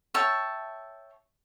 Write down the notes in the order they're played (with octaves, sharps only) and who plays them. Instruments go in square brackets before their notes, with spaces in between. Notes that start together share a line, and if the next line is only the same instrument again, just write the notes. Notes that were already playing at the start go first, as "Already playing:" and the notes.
[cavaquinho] C#5 E5 G5 A5